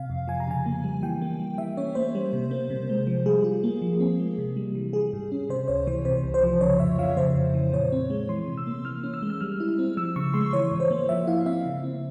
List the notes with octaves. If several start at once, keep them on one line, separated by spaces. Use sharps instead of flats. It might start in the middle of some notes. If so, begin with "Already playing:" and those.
Already playing: C3 F5
F2
F3 G#5
A#5
C#3 G#5
A#3
G3
E3 G5
A#3
G3
E3 E5
C#4 C#5
A#3 C5
G3
C3
A#3
C3
G#3
F3
G3 G#4
F4
A#3
F3
C4
G#3
C3
G3
E3
G3 G#4
G#2
C#4
C3 C5
C#2 C#5
E3 C5
C3 C5
C2
C5
F3
C#3 C#5
F2 E5
F3 F5
C#3 C5
F2
E3
A#2 C#5
C4
G#3
E3 C6
C3
E6
A#3
E3 F6
C#4
E6
G#3
E6
G3 F6
E4
C4
F3 E6
C#3 C#6
G#3 C6
E3 C#5
G#2
C5
A#3
F3 E5
E4 F5
C4 E5
C#3
C4